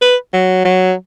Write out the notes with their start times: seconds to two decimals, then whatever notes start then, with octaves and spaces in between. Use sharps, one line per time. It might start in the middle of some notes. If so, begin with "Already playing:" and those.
0.02 B4
0.34 F#3
0.65 F#3